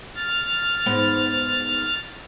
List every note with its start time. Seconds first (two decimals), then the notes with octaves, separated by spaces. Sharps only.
0.16 F6 A6
0.86 G#2 B3